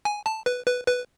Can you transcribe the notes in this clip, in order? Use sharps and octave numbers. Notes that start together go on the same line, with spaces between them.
G#5
A5
B4
B4
B4